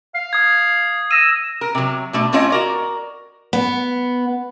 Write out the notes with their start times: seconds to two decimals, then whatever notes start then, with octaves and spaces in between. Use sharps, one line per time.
0.15 F5
0.33 D#6 G#6
1.11 E6 A#6 D#7
1.61 A#4
1.75 C3 F#3
2.13 B2 A3 D4
2.33 A3 C4 C#4 F4 C#5 D#5
2.50 F#4 A#4 D5
3.53 B3